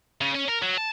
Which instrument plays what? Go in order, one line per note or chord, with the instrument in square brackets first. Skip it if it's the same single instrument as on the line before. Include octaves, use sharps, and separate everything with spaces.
[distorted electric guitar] C#3
C#4
A#4
F#3
A5